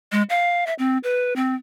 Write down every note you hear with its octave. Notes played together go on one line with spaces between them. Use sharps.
G#3
F5
E5
C4
B4
C4